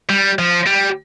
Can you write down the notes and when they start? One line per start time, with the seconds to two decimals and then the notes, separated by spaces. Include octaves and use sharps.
0.09 G3
0.39 F3
0.67 G3